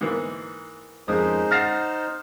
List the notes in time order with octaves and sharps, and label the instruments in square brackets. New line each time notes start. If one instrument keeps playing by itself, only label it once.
[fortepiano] G#2 E3 A#3
[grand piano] F2 C#4 A#4 [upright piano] G#3 [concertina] D#4 C5 [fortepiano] D#6
[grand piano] F#5 A#6 E7 [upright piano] F6 A6 C7